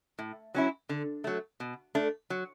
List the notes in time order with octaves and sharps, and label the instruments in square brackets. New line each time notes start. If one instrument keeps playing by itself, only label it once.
[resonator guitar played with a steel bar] A2
F#3 C#4 E4
D3
F#3 A3
B2
A3 D4
F#3